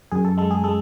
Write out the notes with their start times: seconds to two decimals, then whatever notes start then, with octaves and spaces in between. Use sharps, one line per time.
0.12 F#2 G#4
0.25 A4
0.38 G#3 A4
0.51 G#4
0.64 G#3 A4